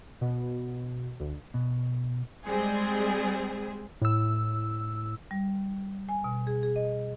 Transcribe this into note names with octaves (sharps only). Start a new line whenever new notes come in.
B2
D2
B2
G3 G#3 C4 G#4
A2 E6
G3
G#5
B2
G#4
G#4
D#5